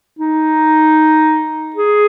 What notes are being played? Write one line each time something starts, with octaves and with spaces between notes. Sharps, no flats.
D#4
G#4